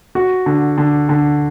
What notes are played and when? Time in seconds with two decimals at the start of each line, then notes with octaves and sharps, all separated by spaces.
0.15 F#4
0.46 D3
0.78 D3
1.09 D3